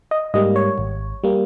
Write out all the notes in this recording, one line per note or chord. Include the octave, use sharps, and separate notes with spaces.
D#5
G#2 G3 A#3 D#5
C#5
G#1
G3 A#3